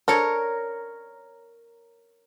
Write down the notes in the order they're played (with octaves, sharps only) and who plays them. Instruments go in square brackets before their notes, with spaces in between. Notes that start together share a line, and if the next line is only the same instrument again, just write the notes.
[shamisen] D4 A4 [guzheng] A#4 C#5 A#5